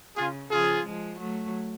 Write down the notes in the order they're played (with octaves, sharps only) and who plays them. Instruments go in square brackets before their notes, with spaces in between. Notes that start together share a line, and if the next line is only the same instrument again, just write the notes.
[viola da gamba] C#3 [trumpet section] F4 G#4
[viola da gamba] C#3 F3 [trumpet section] F4 G#4
[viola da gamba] F3 G#3
F#3 A3